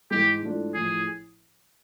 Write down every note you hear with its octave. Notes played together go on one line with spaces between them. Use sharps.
G#2 E3 G#3 G4
G#2 E3 A3 D4 F4
A1 A2 F3 G#4